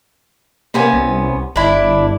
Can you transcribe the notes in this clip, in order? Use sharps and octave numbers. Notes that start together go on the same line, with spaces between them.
C3 A#3 B3 C#4
C2
G1 D4 E4